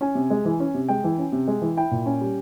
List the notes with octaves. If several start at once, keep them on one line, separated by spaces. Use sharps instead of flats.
C#4 G#5
C3
G#3
E3
C#4
C3
G#3 G5
E3
C#4
C3
G#3
E3
E4 G5
A#2
C#4
G3